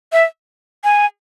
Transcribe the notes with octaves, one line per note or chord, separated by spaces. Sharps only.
E5
G#5